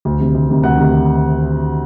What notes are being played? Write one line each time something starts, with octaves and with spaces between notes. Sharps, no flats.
D2
C3 D#3
D2
C3 D#3
D2 F#5
C3 D#3